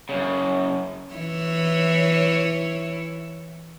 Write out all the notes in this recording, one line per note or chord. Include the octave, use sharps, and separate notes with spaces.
F#2 C#3
E3 E4 C#5